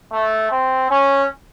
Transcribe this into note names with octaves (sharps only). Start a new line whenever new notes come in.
A3
C4
C#4